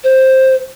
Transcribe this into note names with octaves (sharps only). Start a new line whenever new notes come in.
C5